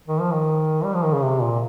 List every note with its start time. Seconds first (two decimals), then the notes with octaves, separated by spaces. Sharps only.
0.08 D#3
0.20 F3
0.33 D#3
0.84 G3
0.94 F3
1.04 D#3
1.13 C#3
1.24 C3
1.42 A#2